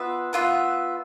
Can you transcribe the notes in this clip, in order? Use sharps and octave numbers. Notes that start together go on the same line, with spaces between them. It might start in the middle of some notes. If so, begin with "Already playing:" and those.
Already playing: B3 F4 B4 E5
B3 F4 B4 E5